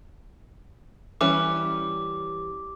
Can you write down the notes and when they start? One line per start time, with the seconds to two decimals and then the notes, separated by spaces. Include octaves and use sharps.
1.21 E3 G3 C#4 D6